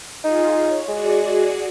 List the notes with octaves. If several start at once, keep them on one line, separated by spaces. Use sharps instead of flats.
D#4 F4 G#4
C#5
G#3 F#4 G#4 D5